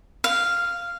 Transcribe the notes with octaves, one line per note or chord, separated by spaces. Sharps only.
F5